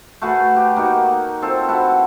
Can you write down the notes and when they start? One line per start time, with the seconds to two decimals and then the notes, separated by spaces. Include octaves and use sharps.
0.22 A3 F#4 G#4 B4
0.56 G4
0.76 A#3 D#4 F#4
1.42 C4 F4 A4
1.68 E4 F#4 A4 A5